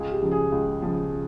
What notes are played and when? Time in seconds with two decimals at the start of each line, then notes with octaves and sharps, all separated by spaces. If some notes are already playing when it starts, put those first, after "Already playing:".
Already playing: C#2 G#4
0.11 G4
0.22 C#3 F3
0.31 G#4
0.52 C#2
0.82 C#3 F3